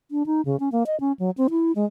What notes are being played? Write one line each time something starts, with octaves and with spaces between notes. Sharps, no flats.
D4
D#4
C#3
C#4
A#3
D#5
C#4
F#3
C4
E4
G#3